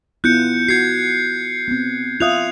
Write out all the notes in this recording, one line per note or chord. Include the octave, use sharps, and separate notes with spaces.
B3 E4 F4 F#6 G6 C#7
F#4 G#6 C7
B3 C4
F4 E5 F5 D#6 F#6 F7